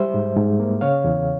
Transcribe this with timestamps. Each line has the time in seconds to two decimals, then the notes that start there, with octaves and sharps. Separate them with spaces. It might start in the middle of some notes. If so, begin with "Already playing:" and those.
Already playing: G3 C5 E5
0.14 G#2
0.36 G#2
0.60 A#3
0.81 C#3 C#5 F5
1.04 E2